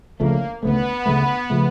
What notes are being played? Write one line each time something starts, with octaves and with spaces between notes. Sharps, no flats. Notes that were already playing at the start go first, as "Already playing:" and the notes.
D2 C#3 F3 A3 A#3
D2 C#3 F3 A3 B3
D2 C#3 F3 A3
C#3 F3 A3